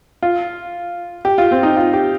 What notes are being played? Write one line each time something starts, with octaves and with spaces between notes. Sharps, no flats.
F4
G4
F4
C4
D#4
F4
G4